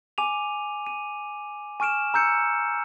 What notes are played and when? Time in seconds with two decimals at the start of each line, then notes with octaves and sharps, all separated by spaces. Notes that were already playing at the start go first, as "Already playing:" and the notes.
0.18 G#5 D6 D#7 F7
0.87 D#7
1.80 G#5 C#6 F6 D7 E7
2.14 A#5 E6 G6 C#7